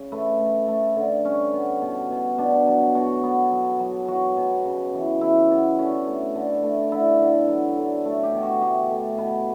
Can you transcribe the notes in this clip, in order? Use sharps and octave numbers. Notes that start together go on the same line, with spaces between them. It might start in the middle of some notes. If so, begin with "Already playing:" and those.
Already playing: C#3
A3 B4
A3
A3
D3
G3 C#4
B3
B2
B2
B2 D4
F#3
B2 F#4
B3
F#3
F#3
F#3 F#4
B2
C#3
E3
C#3 E4
B3
D3 C#4
A3
D3
A3
D3 E4
D3
F#3
D3
A3
G4
B2
F#4
A3 G4
A3
B2 B4